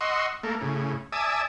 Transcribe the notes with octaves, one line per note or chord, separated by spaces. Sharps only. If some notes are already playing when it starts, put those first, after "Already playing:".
D#5 F#5 C6 C#6 E6
A3 A#3
A2 C#3
D5 E5 G#5 A5 D#6 E6